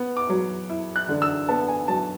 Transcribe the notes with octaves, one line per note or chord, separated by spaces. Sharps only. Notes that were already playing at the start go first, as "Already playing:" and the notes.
Already playing: B3
D6
F#3
E4
F#6
D3
E6
B3 A5
G#5
F#3 A5